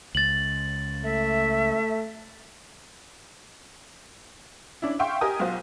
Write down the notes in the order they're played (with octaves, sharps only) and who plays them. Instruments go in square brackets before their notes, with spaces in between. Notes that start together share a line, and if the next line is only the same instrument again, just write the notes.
[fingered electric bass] C#2 [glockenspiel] A6 F#7
[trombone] A3 [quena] E5
[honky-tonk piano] C#4 D4 E4
E5 F5 G5 C6 C#6
G4 A#4 D#5 G5 G#5 D#6
B1 F4 F#4 C5